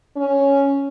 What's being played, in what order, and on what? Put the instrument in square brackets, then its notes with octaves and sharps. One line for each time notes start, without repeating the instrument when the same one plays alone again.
[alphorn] C#4